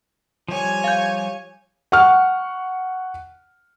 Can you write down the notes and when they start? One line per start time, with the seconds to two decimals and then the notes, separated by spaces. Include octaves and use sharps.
0.48 F3 G3 C#5 G#5
0.84 F5 G6
1.92 F#5 C#6 F6